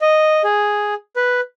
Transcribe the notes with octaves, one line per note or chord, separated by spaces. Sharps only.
D#5
G#4
B4